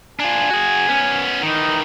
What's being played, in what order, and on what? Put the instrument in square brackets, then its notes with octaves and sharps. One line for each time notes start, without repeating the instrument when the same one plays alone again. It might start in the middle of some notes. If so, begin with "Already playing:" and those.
[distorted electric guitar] D4 F4 [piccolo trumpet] G#5
[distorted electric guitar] F#4 G#4
B3 C#4
[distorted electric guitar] D#3 E3 [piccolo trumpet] D#4